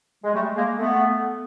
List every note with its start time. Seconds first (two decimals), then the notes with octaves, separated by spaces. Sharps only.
0.23 G#3
0.34 G3 A3
0.56 G#3 A#3
0.78 A3 B3